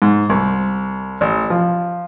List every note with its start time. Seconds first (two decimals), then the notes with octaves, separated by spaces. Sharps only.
0.02 G#2
0.29 C2
1.21 A1
1.50 F3